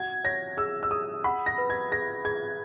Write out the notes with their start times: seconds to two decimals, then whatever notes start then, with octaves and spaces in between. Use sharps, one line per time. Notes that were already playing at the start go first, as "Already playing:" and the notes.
Already playing: F#4 F#5 G#6
0.24 C#5 A#6
0.57 G#4 E6
0.83 E6
0.91 G#4 D#6
1.24 F#5 B5
1.46 A#6
1.58 B4
1.70 G#6
1.91 G#4 A#6
2.25 G#4 G#6